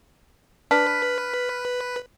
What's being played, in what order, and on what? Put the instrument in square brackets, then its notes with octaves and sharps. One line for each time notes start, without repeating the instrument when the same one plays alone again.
[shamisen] D4 [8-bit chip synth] B4 [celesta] F6 B6